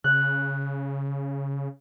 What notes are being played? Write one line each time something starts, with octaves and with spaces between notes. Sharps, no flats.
C#3 F#6